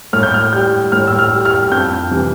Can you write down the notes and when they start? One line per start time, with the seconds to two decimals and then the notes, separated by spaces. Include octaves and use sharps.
0.13 A2 F6
0.23 G6
0.34 F6
0.53 G3 G6
0.92 A2 F6
1.08 E6
1.19 F6
1.31 G3
1.45 F6
1.71 F2 G6
2.11 C3 E3